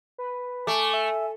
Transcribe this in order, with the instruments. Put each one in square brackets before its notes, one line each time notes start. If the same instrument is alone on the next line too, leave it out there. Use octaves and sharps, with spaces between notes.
[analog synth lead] B4
[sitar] A3 [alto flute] G#5 [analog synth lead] D6
[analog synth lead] E5